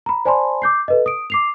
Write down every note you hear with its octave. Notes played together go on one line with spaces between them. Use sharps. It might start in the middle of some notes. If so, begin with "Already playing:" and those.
A#5 B5
C5 D5 G#5 A5 B5 C6
D6 G6 C7
A4 B4 D#5
D#6 D7
D6 C7 F7